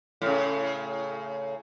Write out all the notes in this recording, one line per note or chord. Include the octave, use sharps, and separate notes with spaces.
A2 C#3